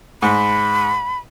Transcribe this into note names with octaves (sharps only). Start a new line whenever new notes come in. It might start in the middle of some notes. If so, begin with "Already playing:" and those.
G#2 B5